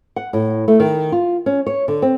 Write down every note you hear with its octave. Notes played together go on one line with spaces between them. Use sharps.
F#5
A2
A3
D#3
F4
C#4
C#5
D3
C4